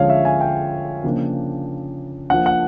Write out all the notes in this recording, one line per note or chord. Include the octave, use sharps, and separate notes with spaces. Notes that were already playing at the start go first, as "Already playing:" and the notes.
Already playing: D3 F3 G#3 C#4 C#5 F5
E5
G#5
G5
C#3 F3 A#3 D4
F3 A#3 D4 F#5
F#5